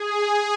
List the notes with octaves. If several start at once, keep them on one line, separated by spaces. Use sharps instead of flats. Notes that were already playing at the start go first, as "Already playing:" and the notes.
Already playing: G#4